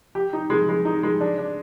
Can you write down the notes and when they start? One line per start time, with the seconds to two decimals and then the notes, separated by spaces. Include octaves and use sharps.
0.15 G4
0.33 D#4
0.50 G#3
0.69 G#3
0.85 D#4
1.03 G#3
1.21 D4
1.38 D4